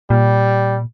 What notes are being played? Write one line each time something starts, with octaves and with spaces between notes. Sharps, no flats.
A#2 G3